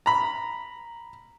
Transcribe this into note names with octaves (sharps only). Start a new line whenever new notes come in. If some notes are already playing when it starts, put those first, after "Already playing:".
A#5 B5